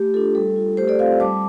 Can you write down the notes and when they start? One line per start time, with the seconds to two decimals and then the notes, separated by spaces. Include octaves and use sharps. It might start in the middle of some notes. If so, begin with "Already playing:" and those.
Already playing: A3 G4
0.14 D4 F4 A4
0.35 G3 A4
0.56 F4
0.77 A3 G4 C5
0.88 A4 D5
0.99 C4 F4 C5 F5
1.20 G3 A5 D6